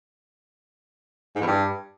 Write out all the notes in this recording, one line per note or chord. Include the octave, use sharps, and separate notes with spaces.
G#2
E2
G2